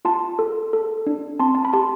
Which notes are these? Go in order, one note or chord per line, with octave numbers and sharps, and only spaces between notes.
F4 A5 C6
A4
A4
D4
C4 A5 C6
A5
B5
G4 A5 C6